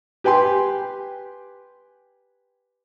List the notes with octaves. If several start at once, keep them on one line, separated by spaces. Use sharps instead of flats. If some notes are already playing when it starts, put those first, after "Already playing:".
G4 B4 G5 G#5 C6